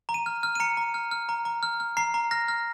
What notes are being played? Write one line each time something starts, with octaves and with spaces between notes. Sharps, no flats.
A#5
D#7
F6
F6
D#7
A#5 C#7
A#5
F6
F6
A#5
A#5
F6
F6
A#5 C7
A#5
F6 A#6
F6